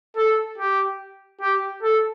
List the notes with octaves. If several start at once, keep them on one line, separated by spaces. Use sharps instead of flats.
A4
G4
G4
A4